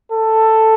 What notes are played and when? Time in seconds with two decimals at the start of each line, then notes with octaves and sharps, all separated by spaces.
0.12 A4